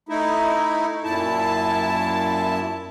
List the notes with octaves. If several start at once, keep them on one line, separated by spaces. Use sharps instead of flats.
A3 D#4 E4
F#2 A#2 E4 A5